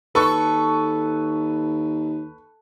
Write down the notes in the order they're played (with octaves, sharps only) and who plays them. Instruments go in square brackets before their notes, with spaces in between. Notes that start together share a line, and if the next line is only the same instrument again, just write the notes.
[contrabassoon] D#2 [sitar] A4 [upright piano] B4 C#6